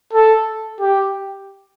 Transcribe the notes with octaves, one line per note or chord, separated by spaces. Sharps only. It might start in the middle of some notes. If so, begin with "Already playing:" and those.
A4
G4